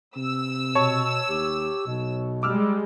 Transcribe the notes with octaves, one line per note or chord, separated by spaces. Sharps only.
C3 E6
B2 C#5 A5 C#6
D#2 G4
B1 B2
G3 G#3 D6 E6 F6